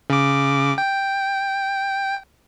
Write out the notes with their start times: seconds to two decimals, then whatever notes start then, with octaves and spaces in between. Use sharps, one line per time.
0.10 C#3 D6
0.78 G5